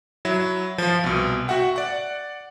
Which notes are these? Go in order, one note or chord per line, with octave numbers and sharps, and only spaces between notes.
F#3 E4
F3 F4
C2 B2
F#4 E5 F#5 G5
D5 F#5